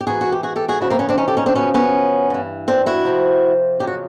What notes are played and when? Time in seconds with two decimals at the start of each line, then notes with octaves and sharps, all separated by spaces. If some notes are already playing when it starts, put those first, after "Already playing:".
0.01 G4
0.06 G#2 E3 F#4 G#4
0.21 F#4
0.32 G4
0.43 F#4 G#4
0.56 G4 A4
0.68 F#4 G#4
0.80 E2 C#3 F3 E4 F#4
0.90 A#3 C4
0.99 B3 C#4
1.09 C4 D4
1.18 C#4 D#4
1.28 G4 A4
1.37 C#4 D#4
1.46 C4 D4
1.55 F#2 C#3 F3 B3 C#4
1.74 B3 C#4
2.30 G2 E3
2.68 C4 D4
2.86 E4 F#4
3.05 F2 C3 F3
3.79 F2 C#3 F#3 G4
3.87 F#4